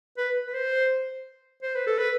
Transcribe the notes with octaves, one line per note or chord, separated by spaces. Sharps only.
B4
B4
C5
C5
B4
A4
B4